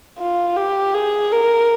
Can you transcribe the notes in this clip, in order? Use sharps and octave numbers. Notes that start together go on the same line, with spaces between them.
F4
G4
G#4
A#4